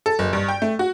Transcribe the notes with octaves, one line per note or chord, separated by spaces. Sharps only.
A4
F#1
G2
G5
A3
F#4